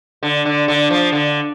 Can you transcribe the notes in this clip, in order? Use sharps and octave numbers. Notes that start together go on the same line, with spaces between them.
D3
D3
D3
F3
D3